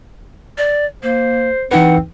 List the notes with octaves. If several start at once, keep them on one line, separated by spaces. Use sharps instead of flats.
D5
A#3 C5
E3 C4 D#4 B4 F#5